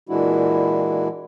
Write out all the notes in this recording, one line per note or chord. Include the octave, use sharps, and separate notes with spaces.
A#2 E3 G#3 D4 E4 F#4